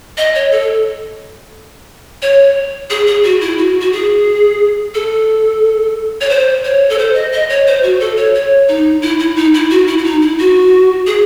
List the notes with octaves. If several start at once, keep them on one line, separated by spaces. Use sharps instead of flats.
D#5
C#5
A4
C#5
G#4
G#4
F#4
E4
F#4
F#4
G#4
A4
C#5
C5
C#5
A4
C5
D#5
D#5
C#5
C5
F#4
A4
C#5
C#5
D#4
E4
E4
D#4
E4
F#4
E4
E4
D#4
E4
F#4
G#4